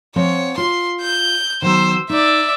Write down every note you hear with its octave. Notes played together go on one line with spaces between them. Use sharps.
F3 C4 C#5 F#5
F4 C6
G6
D#3 F#3 B3 C5 E6
D#4 D5 E5